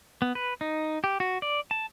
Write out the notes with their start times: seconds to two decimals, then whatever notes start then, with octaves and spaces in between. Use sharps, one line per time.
0.22 B3
0.35 B4
0.61 D#4
1.04 G4
1.20 F#4
1.42 D5
1.71 A5